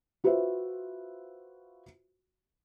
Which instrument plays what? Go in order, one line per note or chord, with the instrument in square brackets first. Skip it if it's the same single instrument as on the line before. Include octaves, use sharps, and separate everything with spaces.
[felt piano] F4 F#4 B4 C5 E5